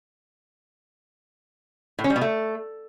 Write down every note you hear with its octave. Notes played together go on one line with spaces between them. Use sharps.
A2
C#4
G3
B2
A3